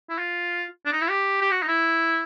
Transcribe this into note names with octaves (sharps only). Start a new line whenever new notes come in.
E4
F4
D4
D#4
E4
G4
G4
F#4
D#4
E4